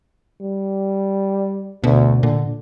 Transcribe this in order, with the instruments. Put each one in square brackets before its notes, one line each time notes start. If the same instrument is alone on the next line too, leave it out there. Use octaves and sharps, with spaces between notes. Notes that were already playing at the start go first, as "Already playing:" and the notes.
[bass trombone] G3
[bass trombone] D2 [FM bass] B2
[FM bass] A#2 [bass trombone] D3